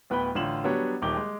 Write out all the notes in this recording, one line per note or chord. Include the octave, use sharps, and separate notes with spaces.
D1 B3 B4 G5 B5 G7
A1 D3 F4 E7 F#7
F#3 G3 B3 D4 C#5
D#1 D#3 G4 D6 G7
G#3